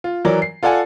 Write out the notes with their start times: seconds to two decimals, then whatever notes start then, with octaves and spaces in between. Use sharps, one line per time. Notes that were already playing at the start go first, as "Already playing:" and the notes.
0.04 F4
0.25 E3 F#3 A#4 D5
0.42 C7
0.63 F4 A4 D5 F#5 G#5